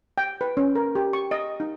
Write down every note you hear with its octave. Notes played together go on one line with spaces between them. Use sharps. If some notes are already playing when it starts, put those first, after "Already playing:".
G5
B4
C#4
A#4
G4
C#6
D#5
D#4